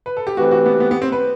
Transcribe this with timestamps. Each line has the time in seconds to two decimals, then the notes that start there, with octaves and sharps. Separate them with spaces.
0.06 B4
0.17 A4
0.27 G4
0.37 E3 A3 C4 F#4 G4 B4
0.51 F#4
0.66 B3
0.80 B3
0.91 B3
1.02 C4
1.12 B4